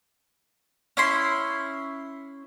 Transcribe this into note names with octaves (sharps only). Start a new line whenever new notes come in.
C#4 E4 C6